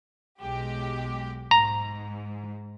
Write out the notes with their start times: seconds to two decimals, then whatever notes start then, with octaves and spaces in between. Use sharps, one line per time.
0.41 B1 G#3 G4
1.51 G#2 A#5